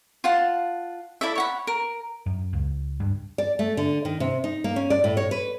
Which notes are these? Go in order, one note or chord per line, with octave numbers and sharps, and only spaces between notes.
F4 F#5 A5
E4 A4 D5 E5
C#5 F#5 B5
A#4
F#2
C#2
G2
D5
A3
D3
D#3
C3
D#4
A#3
C#4
D5
A2
C#5
B4